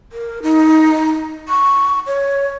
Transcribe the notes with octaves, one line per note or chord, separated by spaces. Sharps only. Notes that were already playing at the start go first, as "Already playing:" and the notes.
A#4
D#4
C#6
C#5